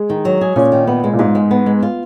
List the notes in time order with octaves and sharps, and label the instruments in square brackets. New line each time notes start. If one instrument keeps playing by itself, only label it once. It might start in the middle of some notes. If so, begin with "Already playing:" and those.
Already playing: [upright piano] G#3
[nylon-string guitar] D#3
F#3
G#4
[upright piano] A#2 [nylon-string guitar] C#4
[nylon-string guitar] D#3
B3
G#3
[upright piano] A#2
[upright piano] G#2 [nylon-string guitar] F4
[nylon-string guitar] G#3
B3
G#3
F4